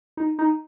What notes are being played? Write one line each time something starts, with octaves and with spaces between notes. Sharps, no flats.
D#4
D#4